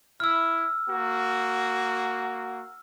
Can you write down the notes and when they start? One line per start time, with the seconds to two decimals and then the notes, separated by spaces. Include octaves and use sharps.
0.20 E4 E6 F6
0.88 A#3 F#4